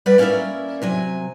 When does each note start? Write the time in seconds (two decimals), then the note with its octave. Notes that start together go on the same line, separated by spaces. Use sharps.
0.06 G3 B4 D5 F#5
0.18 A#3 C#4 E4 A#4 D5 E5
0.82 C3 F#3 G#5